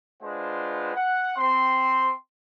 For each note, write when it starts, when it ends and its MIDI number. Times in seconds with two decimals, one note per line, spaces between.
0.22 0.94 56
0.22 0.94 62
0.22 0.94 65
0.22 0.94 71
0.22 0.94 72
0.22 0.94 78
0.95 1.35 78
1.36 2.12 60
1.36 2.12 84